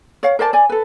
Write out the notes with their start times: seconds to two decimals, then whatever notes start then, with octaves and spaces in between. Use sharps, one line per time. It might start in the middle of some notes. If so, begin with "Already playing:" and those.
0.23 C#5 F5
0.39 A#4 C5 D5 A5
0.53 D5 G#5
0.69 A4 B4